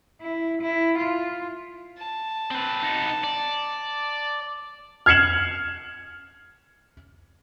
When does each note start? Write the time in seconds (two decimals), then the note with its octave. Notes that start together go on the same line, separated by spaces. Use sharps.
0.22 E4
0.62 E4
0.98 F4
1.98 A5
2.51 C4 B4
2.83 B3 D#4
3.24 D5
5.06 F6 G#6 C7 C#7 E7 F#7